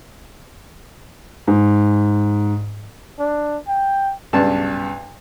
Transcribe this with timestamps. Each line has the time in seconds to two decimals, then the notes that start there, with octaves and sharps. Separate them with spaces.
1.48 G#2
3.19 D4
3.68 G5
4.33 B1 G2 C#3 D4 A5